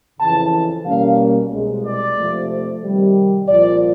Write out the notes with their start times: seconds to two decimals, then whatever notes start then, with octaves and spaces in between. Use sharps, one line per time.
0.19 F2 C#3 E3 A5
0.85 B2 G3 A#3 C#4 F5
1.51 C2 B2 G#3
1.84 D5
2.17 F2 C3 F3 A3
2.83 C3 D#3 G3
3.48 C2 A#2 F3 D5